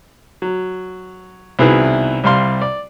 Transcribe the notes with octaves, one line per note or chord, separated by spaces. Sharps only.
F#3
C2 B2 D#3 E4 G#4 B4
C2 G3 F5 C6
D5